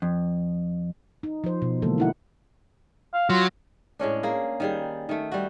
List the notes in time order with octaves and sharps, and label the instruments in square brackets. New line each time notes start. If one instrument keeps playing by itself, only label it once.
[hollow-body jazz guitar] F2
[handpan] D#4
F3 C5
B2
D3 E3 G#3 A#3 A4
D#4 E4 F#5
[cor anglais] F5
[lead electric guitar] F#3 [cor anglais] F4
[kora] A2 G#3 C#4 D4
A#3 G#4
D#3 G3 G#4
D#3 A3
G3 F#4